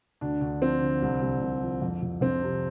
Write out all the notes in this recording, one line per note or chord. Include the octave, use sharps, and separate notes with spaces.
D2 D4
D2
F3 C4
D3
C2
C2
C2
F3
F2
F2
F2 C4
C3